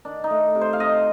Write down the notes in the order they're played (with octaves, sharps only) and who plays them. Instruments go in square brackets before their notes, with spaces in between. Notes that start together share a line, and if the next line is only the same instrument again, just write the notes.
[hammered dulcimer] D#3 D4
D#4
A3
C3
C5
F5
C3 D#5